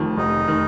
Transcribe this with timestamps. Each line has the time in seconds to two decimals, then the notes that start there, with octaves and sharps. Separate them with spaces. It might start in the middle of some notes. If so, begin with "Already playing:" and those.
Already playing: F1 F2 D#3
0.17 F1 D#4
0.48 D#3